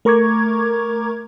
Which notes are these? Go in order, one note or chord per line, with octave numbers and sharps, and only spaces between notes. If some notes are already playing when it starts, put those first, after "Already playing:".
A3 A#4 A#5 C#6 D6 G#6